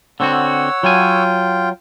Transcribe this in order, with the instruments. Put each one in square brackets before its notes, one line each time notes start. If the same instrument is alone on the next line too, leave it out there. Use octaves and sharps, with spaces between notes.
[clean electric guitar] D3 C4 F#4 [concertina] C#5 F#5 E6
[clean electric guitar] F#3 G#5 [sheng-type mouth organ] F4 G5